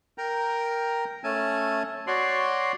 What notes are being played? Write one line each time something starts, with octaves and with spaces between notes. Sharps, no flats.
A#4 G5 A#5
A3 C#4 G#5 A5
F#4 C#5 D5 C6